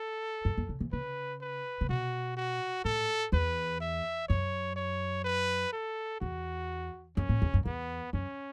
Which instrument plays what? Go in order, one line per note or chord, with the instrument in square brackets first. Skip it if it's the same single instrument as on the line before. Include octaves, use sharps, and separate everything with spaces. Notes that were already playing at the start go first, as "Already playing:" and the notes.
Already playing: [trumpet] A4
[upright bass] F#2
F#2
C#3
E3
[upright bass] C#3 [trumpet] B4
[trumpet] B4
[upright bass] C#3
[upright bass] B2 [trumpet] F#4
[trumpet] F#4
[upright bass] A2 [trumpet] A4
[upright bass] E2 [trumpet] B4
[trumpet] E5
[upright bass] F#2 [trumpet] C#5
[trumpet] C#5
B4
A4
[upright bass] E2 [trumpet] F#4
[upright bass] F#2 [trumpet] C#4
[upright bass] A2
E2
F#2
[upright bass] E2 [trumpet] B3
[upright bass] F#2 [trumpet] C#4